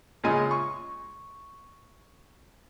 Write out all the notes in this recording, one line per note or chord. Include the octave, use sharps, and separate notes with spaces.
A#2 C#3 G#3 D#5 G#5
C#6